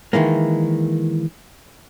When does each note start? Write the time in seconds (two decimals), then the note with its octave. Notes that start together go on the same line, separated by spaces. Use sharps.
0.13 D#3 E3 G#3 A#3